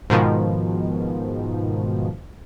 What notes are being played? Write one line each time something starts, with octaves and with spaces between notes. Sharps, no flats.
G#2 B2 D#3 F3